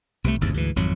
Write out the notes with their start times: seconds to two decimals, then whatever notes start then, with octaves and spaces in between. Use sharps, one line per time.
0.24 C2 C3 F3 A3
0.41 G1 D#2 G#2 C3
0.54 D2 G#2 E3
0.76 G#1 F2 F#3